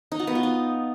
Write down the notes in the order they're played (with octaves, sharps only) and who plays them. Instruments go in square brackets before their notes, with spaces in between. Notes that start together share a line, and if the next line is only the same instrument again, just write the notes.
[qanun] D#4
F#4
B3
F4
D#4